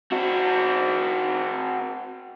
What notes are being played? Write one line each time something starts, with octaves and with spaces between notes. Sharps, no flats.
C4 F#4